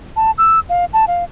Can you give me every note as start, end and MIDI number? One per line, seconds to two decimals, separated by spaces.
0.16 0.31 81
0.38 0.59 88
0.69 0.85 77
0.93 1.05 81
1.08 1.24 77